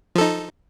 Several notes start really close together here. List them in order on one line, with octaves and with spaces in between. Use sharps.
F3 A4 D#4